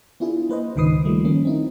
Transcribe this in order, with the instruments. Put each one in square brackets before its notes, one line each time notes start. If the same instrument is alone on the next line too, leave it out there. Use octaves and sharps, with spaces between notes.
[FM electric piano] B3 D4 E4 F4 G#4
A#3 B4 C5 D#5
C#2 G#2 D#3 B4 D#6 C7
D#3 F3 G3 A3 A#3
D#3 A#3 C#4
C4 D#4 E4